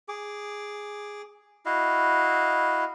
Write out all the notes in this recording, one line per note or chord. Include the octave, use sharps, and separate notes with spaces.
G#4 D6
E4 F#4 D#5 F5